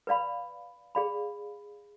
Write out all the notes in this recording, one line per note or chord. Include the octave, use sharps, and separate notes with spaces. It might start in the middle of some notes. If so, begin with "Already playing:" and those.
B4 D5 F5 B5
G#4 D5 F5 B5